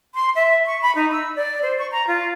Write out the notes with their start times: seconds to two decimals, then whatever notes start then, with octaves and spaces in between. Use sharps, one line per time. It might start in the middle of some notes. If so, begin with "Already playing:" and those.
0.15 C6
0.35 E5
0.67 C#6
0.82 B5
0.95 D#4
1.12 E6
1.36 D5
1.62 C5
1.79 C#6
1.92 A#5
2.07 F4